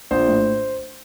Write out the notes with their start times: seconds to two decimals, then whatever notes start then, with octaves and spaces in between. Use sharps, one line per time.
0.11 A#1 C5
0.28 A2